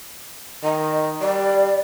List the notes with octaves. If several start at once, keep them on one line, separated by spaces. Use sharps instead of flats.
D#3 D#5
G3 D5